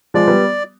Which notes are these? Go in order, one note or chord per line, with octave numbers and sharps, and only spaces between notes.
F3 G#3 D5
G3 B3